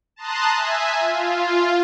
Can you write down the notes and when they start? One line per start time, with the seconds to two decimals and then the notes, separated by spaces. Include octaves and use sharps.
0.16 A5 A#5 C6 D#6 F#6
0.55 E5 G#5
0.99 F4